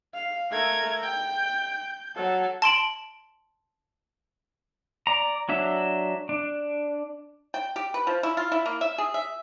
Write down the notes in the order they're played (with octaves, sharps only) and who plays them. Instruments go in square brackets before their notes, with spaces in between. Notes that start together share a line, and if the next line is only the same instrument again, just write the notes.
[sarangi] F5
[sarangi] A3 [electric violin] A#4 G#6
[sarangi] G5 [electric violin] G6
[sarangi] F#3 [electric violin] A4
[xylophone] A5 C6 D7 F#7
[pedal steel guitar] D5 A#5
F#3 D4 E5
D4
[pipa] G5
G4
B4
F3
E4
F4
E4
A#3
E5
G#4
E5